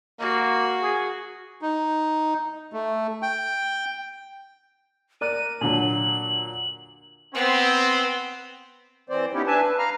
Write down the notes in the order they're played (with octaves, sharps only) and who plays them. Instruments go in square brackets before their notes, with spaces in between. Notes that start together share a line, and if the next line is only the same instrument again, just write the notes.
[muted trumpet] A#3 [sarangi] F#4
[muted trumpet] G#4
[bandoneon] D#4
A3
G5
[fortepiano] A#4 D5 F#6 [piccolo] D#7
[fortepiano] A#2 D3 F#3 [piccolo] F#7
[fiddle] B3 [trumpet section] C4
[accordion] E3 C4 C5 D5
B3 C#4 D#4 E4 G4
D4 B4 E5 G#5 A5
B4
F5 A#5 F6